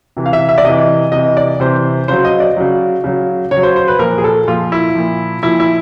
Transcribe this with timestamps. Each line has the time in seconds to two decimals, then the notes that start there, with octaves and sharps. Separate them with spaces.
0.17 C3 E3
0.26 F5
0.33 E5
0.49 E5
0.58 D5
0.64 C3 E3 D#5
1.12 C3 E3 D#5
1.37 D5
1.60 C3 E3 C5
2.08 C#3 F#3 C5
2.25 D#5
2.40 D5
2.57 C#3 F#3
3.04 C#3 F#3
3.51 C#3 C#5
3.56 F#3
3.63 C5
3.76 C5
3.88 B4
3.99 A#2 F3 A#4
4.18 G#4
4.24 A4
4.48 A#2 F3 F4
4.72 E4
4.95 A#2 F3
5.43 A#2 F3 E4
5.60 E4